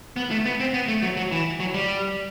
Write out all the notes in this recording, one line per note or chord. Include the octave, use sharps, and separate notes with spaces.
B3
A3
B3
C4
B3
A3
F#3
F#3
E3
F#3
G3